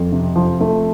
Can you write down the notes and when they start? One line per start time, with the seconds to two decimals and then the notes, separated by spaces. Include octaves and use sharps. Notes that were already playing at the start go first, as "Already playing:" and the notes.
Already playing: F2
0.12 C3
0.36 F3
0.61 A3